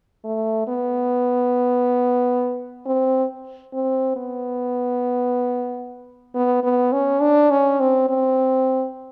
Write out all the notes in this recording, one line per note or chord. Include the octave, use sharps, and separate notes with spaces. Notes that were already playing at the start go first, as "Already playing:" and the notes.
A3
B3
C4
C4
B3
B3
B3
C#4
D4
C#4
C4
C4